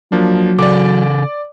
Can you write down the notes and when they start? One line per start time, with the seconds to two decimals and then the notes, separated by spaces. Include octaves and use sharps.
0.12 F3 F#3 A#3 D4
0.59 C#3 A4 D5 D6